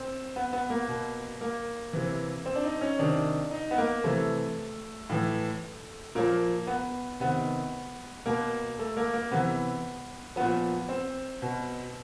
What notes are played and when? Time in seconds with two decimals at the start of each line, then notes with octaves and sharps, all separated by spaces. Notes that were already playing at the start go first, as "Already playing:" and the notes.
Already playing: C4
0.36 B3
0.53 B3
0.70 A#3
0.88 B2
1.41 A#3
1.93 C3 E3
2.46 C4
2.55 D4
2.64 D#4
2.81 C#4
2.99 C3 D#3 D4
3.51 D#4
3.71 B3
3.78 A#3
4.04 C3 E3 A3
5.09 A2 E3
6.15 A#2 F3 A#3
6.67 B3
7.20 C3 D#3 B3
8.26 B2 A#3
8.79 A3
8.97 A#3
9.13 A#3
9.31 C3 E3 B3
10.36 A#2 F3 B3
10.89 C4
11.42 B2